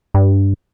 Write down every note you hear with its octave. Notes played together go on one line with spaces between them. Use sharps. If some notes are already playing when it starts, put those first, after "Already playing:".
G2